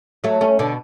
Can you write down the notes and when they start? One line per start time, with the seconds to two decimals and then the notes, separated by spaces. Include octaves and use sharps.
0.24 F#3 A3
0.41 A3 C#4
0.59 B2 D3